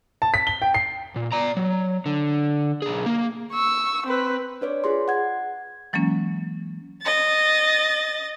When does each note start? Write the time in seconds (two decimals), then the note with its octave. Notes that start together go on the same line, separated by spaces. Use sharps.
0.22 A5
0.34 B6
0.47 G7
0.62 G5
0.74 C7
1.16 A#2
1.32 D5 A#5
1.57 F#3
2.06 D3
2.82 B1 G#4
3.06 A#3
3.52 C#6 E6
4.06 C4 B4
4.61 D4 B4 C#5 D5
4.84 F4 G#4 C6
5.08 F#5 G#6
5.93 E3 F#3 G#3 A#3 C#4
7.03 D#5 A6